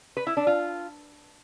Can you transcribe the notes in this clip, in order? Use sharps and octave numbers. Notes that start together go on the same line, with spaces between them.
B4
E4
D4
F4